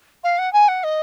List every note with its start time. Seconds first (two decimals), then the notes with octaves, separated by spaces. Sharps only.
0.24 F5
0.38 F#5
0.53 G#5
0.68 F#5
0.84 D#5